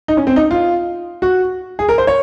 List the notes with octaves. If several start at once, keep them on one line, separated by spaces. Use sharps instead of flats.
D#4
C#4
C4
D#4
F4
F#4
G#4
A#4
C5
C#5